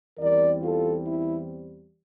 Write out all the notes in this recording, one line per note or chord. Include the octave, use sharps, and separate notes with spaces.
E2 E3 G3 C4 A#4 D5
F4 A4
E4